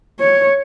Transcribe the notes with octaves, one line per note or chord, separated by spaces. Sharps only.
C#5